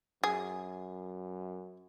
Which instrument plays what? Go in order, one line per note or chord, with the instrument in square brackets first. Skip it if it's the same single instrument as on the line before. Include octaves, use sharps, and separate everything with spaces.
[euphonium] F#2 [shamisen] G#4